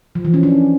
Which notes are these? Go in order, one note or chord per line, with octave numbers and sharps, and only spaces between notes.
F3
E3
C#4
D4